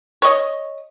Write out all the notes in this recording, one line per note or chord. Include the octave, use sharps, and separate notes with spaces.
C#5 D#5